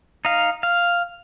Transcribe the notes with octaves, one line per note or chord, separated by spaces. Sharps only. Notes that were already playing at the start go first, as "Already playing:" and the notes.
D#4 F5
F5